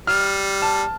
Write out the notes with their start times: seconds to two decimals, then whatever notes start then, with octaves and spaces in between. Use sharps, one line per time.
0.07 G3 F6
0.62 A5